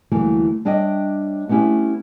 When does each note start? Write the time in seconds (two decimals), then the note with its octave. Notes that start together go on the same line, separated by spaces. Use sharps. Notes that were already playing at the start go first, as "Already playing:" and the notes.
0.11 D2 E3 F#3 G3 A3 A#3
0.65 G3 D4 C#5 D#5 E5 G5
1.49 A3 B3 C#4 E4 G4 E5